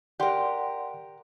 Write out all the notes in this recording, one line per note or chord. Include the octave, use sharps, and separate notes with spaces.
G4 A#4 D5 F#5 C6